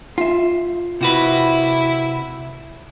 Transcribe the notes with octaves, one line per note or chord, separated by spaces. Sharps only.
F4 E5
C3 E4 F#4 B4